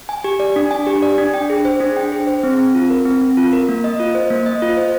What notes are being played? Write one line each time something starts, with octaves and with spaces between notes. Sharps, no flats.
G#5
G4
D5
D4
G#5
G4
D5
D4
G5
G#4
C5
D4
G5
G#4
C5
C4
C4
F4
A#4
C4
C4
F4
A#4
A#3
D#5
F4
C5
A#3
D#5
F4
C5